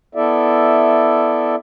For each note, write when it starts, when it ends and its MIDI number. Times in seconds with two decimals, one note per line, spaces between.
0.15 1.56 59
0.15 1.56 64
0.15 1.56 69
0.15 1.56 74
0.15 1.56 76